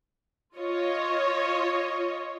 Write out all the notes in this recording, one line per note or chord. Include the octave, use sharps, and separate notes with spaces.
F4 C#5 D#5